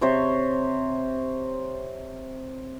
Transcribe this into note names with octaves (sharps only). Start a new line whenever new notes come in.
C3 C5 C#5